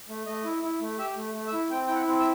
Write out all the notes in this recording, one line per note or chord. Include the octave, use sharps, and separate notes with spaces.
A3
A3 D#5
E4
E4
A3
G4 E5
A3
A3
E5
E4
C4 G5
E4 G5
F#5
C4
E5